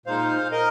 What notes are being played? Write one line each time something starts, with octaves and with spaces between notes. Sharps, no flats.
A#2 G#3 D#4 C5 F5
A#4 D#5